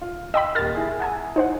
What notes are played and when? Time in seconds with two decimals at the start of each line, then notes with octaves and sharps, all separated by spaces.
0.01 F4
0.34 D#5 G5 B5 E6
0.55 D#1 A#4 F6 A6
0.75 E4 G#4
1.00 F#5 G#5 A5
1.36 D#4 C5 F#5